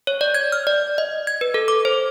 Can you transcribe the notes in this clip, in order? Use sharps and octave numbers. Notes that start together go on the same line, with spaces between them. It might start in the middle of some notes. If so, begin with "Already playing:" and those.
C#5
D5
G#6
F6
D5
D#5
G#6
B4
A4
D6
C5